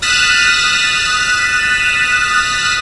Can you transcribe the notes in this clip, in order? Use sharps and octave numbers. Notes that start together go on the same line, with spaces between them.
D#6 F6 F#6 A6 B6 E7